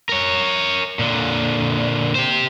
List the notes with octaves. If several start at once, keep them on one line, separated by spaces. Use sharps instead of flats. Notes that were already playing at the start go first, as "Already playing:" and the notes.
A#4 C#5
A#2 D3
G4 C5